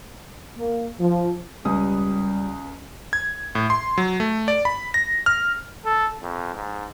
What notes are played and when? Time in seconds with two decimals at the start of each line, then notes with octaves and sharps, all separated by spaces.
0.56 A#3
0.99 F3
1.65 C#2 G3 D#6
3.13 G#6
3.55 A2
3.70 C6
3.98 F#3
4.20 A3
4.48 D5
4.65 B5
4.94 A#6
5.26 F6
5.85 A4
6.22 F2
6.55 G#2